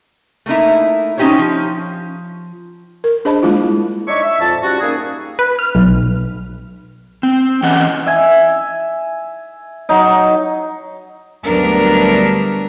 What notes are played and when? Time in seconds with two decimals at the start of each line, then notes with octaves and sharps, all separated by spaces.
0.46 A3 A#3 D#4 E4
1.18 C#4 D#4 F4 G4 C5 C#5
1.39 F3
3.04 A#4
3.25 D4 G#4 C5 D#5 A5 B5
3.43 G3 G#3 A#3 E4 F4
4.08 D4 D#4 C#5 D#5 E5 C#6
4.23 E5
4.40 F2 A#2 A5
4.63 G#2 G3 C#4 F#4
4.80 G3 A#3 C#4 D#4 G#4
5.39 B4
5.59 F6
5.75 B1
7.23 C4
7.63 E3 C#4 D#5 F#5
8.06 E5 G#5
9.89 F#3 D#4
11.44 D2 F#3 G3 B3 D4 A#4